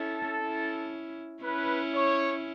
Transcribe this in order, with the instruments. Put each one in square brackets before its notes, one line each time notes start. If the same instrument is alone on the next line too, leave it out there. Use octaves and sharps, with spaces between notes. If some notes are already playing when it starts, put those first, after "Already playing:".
Already playing: [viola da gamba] C#4 E4 [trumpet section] A4
[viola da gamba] C#4 E4
[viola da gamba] C#4 E4 [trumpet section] B4
[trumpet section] C#5